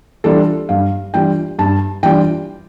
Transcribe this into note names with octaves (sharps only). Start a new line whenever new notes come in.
E3 G3 D4 F4 A4
G2 F5
E3 G3 D4 F4 G5
G2 A5
E3 G3 D4 F4 G5